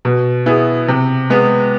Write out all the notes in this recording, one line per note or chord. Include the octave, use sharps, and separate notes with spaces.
B2
B3 E4 G#4
C3
G#3 B3